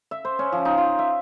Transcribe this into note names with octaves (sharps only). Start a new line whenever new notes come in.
E5
C5
C#4
F3
D#4
F4
E5